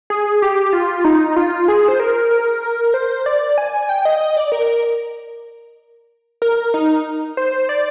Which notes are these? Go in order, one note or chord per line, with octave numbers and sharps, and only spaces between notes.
G#4
G4
F4
D#4
F4
G#4
C5
A#4
A#4
A#4
C5
D5
G#5
G#5
G5
D#5
D#5
D5
A#4
A#4
D#4
C5
D5